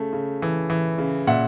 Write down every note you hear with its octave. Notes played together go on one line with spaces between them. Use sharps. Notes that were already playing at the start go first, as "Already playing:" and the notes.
Already playing: C#3 A3
C#3
E3
E3
C#3
A#2 E5 F#5